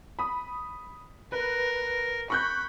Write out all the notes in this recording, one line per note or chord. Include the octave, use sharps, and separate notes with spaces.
B5 D#6
A#4 B4
B5 C#6 F#6 G6